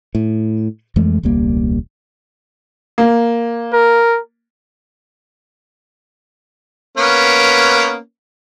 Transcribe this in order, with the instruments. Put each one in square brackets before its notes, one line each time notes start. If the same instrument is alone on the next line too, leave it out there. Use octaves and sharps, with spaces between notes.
[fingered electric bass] A2
F2 E3 G#3 A3
E1 C#2 G3 A#3
[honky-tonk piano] A#3
[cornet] A#4
[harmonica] A#3 B3 C#4